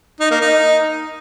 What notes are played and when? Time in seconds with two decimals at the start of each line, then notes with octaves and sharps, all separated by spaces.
0.20 D#4
0.31 A#3
0.41 D#4